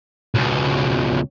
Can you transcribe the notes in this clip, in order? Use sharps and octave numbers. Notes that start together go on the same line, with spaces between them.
C#2 B2